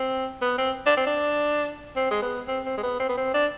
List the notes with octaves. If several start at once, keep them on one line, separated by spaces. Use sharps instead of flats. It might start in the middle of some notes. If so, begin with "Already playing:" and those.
Already playing: C4
B3
C4
D4
C4
D4
C4
G#3
B3
C4
C4
G#3
B3
C4
B3
C4
D4